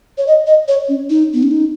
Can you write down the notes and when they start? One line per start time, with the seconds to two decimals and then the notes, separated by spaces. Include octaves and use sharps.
0.18 C#5
0.27 D#5
0.47 D#5
0.68 C#5
0.89 C#4
1.10 D#4
1.34 B3
1.43 C#4
1.51 D#4